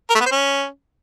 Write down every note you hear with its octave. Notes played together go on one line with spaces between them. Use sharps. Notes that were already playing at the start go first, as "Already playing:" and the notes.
A#4
A3
B3
C5
C#4